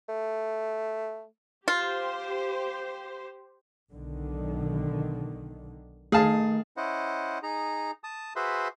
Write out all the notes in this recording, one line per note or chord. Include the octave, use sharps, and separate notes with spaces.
A3
F4 G4 C5
B1 D3 D#3
D#3 A3 G#4 F5 A5
C#4 E4 C5 D#5 F#5
D#4 G#4 A#5
A5 D#6
F#4 G#4 B4 C5 E5 C6